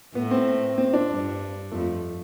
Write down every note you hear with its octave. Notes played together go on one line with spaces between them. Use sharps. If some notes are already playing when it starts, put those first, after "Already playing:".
A2 B3
C4
C4
D4
G2
F2 A3